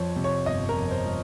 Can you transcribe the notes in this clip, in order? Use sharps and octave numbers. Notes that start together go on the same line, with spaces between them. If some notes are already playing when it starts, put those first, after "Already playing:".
Already playing: F2 F3 C#5
C3
C#5
G1 D#5
A#4
F2
C5
F3